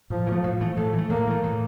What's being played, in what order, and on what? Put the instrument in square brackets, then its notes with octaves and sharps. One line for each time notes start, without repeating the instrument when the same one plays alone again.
[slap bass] A2 [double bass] F3
[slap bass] E3
A3
A2
E3 A3
[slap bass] A2 [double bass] A3
[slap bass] E3 A3
[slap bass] A2 [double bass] A#3
[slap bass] E3 A3
A2